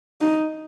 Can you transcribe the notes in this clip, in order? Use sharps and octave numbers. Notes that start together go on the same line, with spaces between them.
D#4